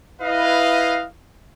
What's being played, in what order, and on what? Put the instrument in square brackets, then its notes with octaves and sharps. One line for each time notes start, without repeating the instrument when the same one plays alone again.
[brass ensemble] E4 B4 D#5 F5